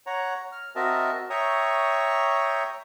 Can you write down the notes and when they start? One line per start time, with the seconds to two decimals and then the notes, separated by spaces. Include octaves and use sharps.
0.06 C#5 F#5 A#5
0.52 F6
0.76 C4 F#4 A#4 D#5 E5 A5
1.30 C#5 E5 G5 A#5 C#6 D#6